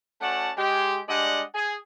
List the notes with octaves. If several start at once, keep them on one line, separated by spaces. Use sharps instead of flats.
A3 C#4 F#4 D5 F#5 A5
G#3 G4
G3 G#3 D4 D5 D#5 F#5
G#4